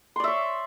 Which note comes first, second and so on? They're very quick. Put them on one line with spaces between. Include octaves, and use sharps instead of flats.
C6 D5 E5 C#5